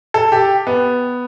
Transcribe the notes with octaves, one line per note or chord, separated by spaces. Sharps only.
A4
G4
B3